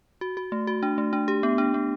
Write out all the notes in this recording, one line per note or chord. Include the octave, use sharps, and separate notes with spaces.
F#4
F#4
A3
F#4
D4
A3
D4
G4
B3
D4
B3